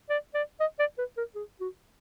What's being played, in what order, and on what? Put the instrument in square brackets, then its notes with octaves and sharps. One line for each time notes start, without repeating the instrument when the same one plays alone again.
[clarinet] D5
D5
D#5
D5
B4
A#4
G#4
F#4